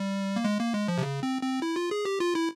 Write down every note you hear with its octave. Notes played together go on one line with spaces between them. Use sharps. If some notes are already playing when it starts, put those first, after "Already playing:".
Already playing: G3
A#3
G#3
A#3
G#3
F3
C3
C#3
C4
C4
E4
F4
G#4
G4
F4
E4